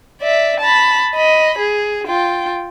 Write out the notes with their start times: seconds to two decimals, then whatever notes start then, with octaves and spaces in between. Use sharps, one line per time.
0.21 D5 E5
0.60 A5 B5
1.15 D#5 B5
1.58 G#4
2.08 F4 G5